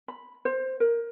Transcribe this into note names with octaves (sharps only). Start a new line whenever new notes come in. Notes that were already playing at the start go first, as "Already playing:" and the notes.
B5
C5
A#4